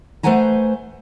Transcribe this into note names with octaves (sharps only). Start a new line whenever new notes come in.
A3 B4 C5 F#5 G#5 A#5